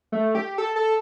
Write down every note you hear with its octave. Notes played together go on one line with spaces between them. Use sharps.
A3
G4
A4
A4